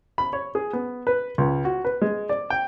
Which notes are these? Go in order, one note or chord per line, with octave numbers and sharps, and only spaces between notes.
B5
C#5
G#4
B3
B4
C#2
F#4
B4
G#3
D5
G5